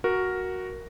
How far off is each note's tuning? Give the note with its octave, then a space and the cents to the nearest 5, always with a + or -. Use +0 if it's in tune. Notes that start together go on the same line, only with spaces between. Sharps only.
F#4 +0 A#4 +0